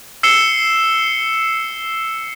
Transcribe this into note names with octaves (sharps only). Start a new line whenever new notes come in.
E6 C7 C#7 E7 G7